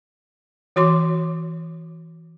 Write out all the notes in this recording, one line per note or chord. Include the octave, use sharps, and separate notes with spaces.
E3 F#4 C#5 C6 D6